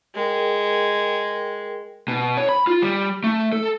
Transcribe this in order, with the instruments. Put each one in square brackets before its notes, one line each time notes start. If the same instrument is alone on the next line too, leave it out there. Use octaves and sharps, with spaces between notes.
[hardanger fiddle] G#3 [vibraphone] G#4 A#4 G5
[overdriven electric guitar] B2
C#5
B5
F4
G3
A3
A4